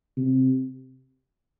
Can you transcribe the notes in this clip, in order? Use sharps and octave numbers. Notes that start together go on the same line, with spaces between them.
C3